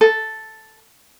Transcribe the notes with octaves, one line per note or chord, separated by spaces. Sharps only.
A4